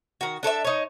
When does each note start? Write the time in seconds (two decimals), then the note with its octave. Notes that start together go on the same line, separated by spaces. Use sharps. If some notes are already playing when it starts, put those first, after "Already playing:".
0.21 D#3 F#4
0.43 D4 A4 C5 E5
0.65 D#4 C#5